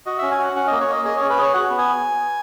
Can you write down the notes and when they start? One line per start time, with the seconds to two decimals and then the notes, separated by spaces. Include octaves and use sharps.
0.06 F#4 D#5
0.18 C#4 E5
0.31 G#5
0.39 F#4 F#5
0.56 C#4 F#5
0.67 A#3 D#5
0.81 C#5
0.88 A#3 D#5
1.04 G#4 D#5
1.16 C#4 C#5
1.30 B4
1.38 G#4 C#5
1.54 F#4 F#5
1.70 B3
1.78 G#5